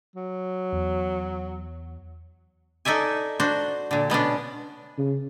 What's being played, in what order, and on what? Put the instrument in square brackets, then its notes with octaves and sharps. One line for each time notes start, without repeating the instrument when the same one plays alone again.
[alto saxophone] F#3
[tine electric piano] E2
[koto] D#4 A4 D5 E5 G#5
D4 F#4 C5
A#2 D3
B2 B3 C#4 D4
[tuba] C#3